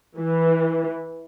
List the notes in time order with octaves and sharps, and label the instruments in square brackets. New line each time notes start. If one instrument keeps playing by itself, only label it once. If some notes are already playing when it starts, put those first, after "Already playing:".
[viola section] E3